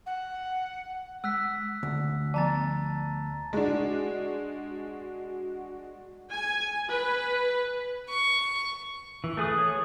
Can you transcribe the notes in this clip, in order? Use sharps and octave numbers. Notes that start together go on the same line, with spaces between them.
F#5
G#3 E6 F#6 B6
D2
F3 B3 A5 A#5 A6
G#3 D4 F#4
G#5
B4
C#6
E3
A3 G#4 B4 D#6
C#5